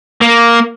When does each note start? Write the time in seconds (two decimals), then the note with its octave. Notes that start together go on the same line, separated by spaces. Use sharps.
0.21 A#3